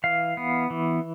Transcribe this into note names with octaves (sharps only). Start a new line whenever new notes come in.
E3 F5
B3
E3